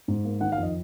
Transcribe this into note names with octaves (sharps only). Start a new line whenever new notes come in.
G#2
A#3
D#3 F#5
F5
F2
D#5